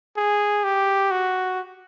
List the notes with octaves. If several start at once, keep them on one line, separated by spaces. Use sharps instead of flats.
G#4
G4
F#4